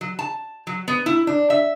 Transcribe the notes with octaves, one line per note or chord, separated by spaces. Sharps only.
F#3
A5
F#3
B3
E4
D4
E5